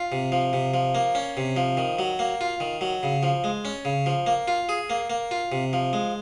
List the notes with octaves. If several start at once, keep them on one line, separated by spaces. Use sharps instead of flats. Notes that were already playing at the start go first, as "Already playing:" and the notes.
Already playing: F4
C3
F3
C3
F3
A#3
C#4
C3
F3
D#3
F#3
A#3
F4
D#3
F#3
C#3
F3
G#3
C#4
C#3
F3
A#3
F4
G#4
A#3
A#3
F4
C3
F3
G#3